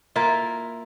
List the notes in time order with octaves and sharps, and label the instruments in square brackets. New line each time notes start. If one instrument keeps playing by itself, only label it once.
[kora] A#3 E4 F4